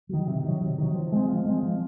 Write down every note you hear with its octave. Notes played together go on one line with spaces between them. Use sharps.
D#3 F#3
C3
D#3 F#3
C3
D#3 F#3
F3
G#3 C4
F3
G#3 C4
F3